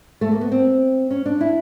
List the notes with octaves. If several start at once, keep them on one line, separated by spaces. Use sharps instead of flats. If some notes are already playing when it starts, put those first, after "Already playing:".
A3
A#3
B3
C4
C#4
D4
E4